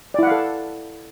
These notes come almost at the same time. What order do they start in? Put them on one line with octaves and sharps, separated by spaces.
D5 E4 F#5 F5 A4